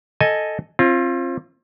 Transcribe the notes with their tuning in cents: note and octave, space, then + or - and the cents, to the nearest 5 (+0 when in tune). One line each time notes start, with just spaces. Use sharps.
A4 +0 D#5 +0 G#5 +0
C4 +35 F4 -10